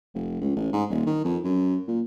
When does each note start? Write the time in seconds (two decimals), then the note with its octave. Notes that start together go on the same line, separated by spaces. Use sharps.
0.15 F1
0.41 C#2
0.56 A1
0.73 G#2
0.90 D#1
1.06 D#3
1.25 F2
1.44 F#2
1.87 A#2